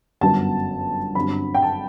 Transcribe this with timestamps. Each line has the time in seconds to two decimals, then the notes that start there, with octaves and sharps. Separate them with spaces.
0.21 G1 F#2 F#3 B3 A5
1.15 G1 G2 F#3 C4 B5
1.55 G5
1.62 A5